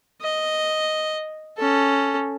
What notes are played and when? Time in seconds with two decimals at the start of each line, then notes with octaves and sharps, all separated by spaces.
0.22 D#5
1.58 C#4 A4